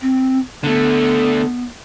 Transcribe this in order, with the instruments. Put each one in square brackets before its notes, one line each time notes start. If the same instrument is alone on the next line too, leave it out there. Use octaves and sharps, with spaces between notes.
[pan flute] C4
[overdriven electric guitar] D3 A3 [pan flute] B3